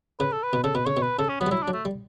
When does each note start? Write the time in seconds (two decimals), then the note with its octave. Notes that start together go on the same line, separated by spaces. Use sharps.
0.20 C#3 B4
0.32 A4
0.43 B4
0.53 B2
0.64 C#3 A4
0.75 B2 B4
0.85 C#3 C#5
0.97 B2
1.02 B4
1.18 C#3 A4
1.29 C#4
1.40 F#3 B3
1.47 G3
1.51 F#3 E4
1.63 F#3 D4
1.73 A3
1.85 G3